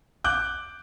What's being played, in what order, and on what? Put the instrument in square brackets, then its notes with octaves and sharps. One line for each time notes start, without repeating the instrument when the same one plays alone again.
[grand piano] D6 F#6 G6